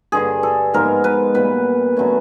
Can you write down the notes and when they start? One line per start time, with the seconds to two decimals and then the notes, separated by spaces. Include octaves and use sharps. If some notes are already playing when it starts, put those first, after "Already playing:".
0.12 G2 D3 G3 G#4
0.43 A4
0.74 G#2 F3 G#3 B3 A#4
1.04 B4
1.34 A#2 G3 B3 B4
1.97 D3 F#3 A3 C#4